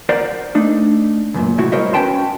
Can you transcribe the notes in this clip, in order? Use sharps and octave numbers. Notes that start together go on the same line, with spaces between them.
A#4 C5 D5 F#5
A3 D4 D#4
C#2 F#2 A#2
A2 C3 E4 F#4
G3 A#4 C5 C#5 D#5 E5
C#4 F#4 B4 G5 A5 C6